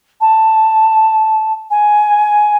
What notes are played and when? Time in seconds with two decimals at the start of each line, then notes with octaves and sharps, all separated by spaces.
0.21 A5
1.70 G#5